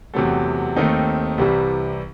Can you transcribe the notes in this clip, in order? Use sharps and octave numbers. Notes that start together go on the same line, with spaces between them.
E2 C3 F#3 A3
D#2 D#3 A3 C4 D#4
C2 C3 E3 G3